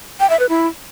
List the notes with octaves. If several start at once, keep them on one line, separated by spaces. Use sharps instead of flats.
G5
E5
B4
E4